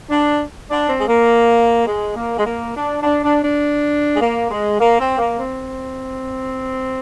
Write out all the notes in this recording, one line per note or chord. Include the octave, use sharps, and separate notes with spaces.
D4
D4
C4
G#3
A#3
G#3
A#3
G#3
A#3
D4
D4
D4
D4
G#3
A#3
G#3
A#3
C4
A#3
C4